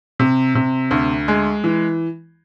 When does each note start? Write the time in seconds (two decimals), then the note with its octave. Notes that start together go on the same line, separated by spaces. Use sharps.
0.20 C3
0.55 C3
0.91 D2
1.28 G#3
1.64 E3